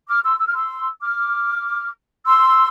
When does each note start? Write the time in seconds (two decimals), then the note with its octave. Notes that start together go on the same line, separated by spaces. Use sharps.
0.08 D6 F6
0.24 C6 E6
0.40 E6
0.47 F6
0.55 C6 E6
1.01 D6 F6
2.26 C6 E6